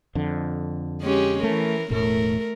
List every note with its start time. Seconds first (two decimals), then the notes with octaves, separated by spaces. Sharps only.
0.15 F2 D3
1.02 G#3 C#4 G4
1.43 E3 A3 A#4
1.90 E1 A2 A3 A#4